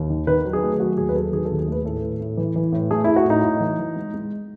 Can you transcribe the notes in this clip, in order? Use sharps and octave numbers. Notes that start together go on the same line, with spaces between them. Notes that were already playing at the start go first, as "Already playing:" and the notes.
Already playing: D#2
D#3
D#3 B4
F#3
G#4
A3
F#3 F#4
D#2 G#4
B4
F#3 A4
D#3 G#4
A4
D#2
G#4
A3 B4
A2 A4
A2
A2
E3
E3
A2
A3 G#4
A3 E4
F#4
A2 D#4
A2
E3
E3
G#3
G#3